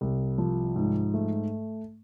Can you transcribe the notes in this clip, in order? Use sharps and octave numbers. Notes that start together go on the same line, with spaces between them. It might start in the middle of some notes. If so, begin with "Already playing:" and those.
C2
F3
G#2
A3